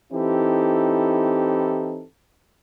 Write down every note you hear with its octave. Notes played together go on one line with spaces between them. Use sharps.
E3 C4 D#4 E4 G4 A4